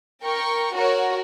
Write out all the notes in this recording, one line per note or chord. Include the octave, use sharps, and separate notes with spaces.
A#4 G5 C#6
F#4 A#4 C#5